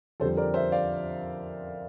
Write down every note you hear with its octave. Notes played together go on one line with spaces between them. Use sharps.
F2 D3 G3 A4 C5
A#4 D5
C5 E5
D5 F5